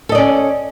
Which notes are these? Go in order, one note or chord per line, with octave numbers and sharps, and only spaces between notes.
C#4 A4 D5 D#5